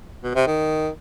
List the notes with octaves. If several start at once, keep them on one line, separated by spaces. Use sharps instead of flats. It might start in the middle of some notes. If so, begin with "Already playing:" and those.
B2
C3
D#3